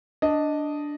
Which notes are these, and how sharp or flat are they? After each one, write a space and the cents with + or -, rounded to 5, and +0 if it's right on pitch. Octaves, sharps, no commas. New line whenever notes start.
D4 +0 D#5 +0